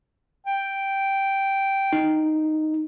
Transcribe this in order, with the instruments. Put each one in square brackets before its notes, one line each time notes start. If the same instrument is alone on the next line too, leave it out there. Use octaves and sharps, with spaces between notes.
[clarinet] G5
[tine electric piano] D#4